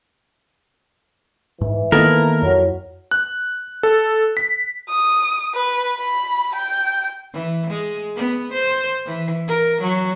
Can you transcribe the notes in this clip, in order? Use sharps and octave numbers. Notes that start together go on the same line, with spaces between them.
G#2 E3
D#3 A#3 B3 E4 A4 A#4 D#5
F2 F#3
F#6
A4
B6
D#6
B4
B5
G5
E3
G#3
B3
C5
E3
A#4
F#3